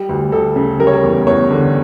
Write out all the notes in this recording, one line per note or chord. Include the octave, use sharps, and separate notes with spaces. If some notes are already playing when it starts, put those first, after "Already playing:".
Already playing: G3 G4
D2
D2 A4
C#3
G3 A#4
C#5
A#4
E2
E2 C#5
D3